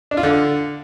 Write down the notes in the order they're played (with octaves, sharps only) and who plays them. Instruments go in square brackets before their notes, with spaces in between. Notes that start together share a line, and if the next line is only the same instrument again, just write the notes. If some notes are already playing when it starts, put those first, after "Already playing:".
[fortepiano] D4
F4
D3